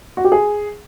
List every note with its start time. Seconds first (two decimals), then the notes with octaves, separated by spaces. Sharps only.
0.17 F#4
0.24 G4
0.32 G#4